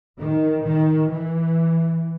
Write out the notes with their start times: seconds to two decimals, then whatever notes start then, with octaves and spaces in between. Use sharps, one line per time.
0.20 D#3
0.65 D#3
1.10 E3